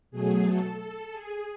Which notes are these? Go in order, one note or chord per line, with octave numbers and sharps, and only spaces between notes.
B2 F#3 A3 G#4
A4
A4
G#4